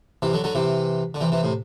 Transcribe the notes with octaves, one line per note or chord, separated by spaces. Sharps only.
C3 E3
D3 F#3
D3 F#3
C3 E3
D3
C3 E3
C3 E3
A2 C3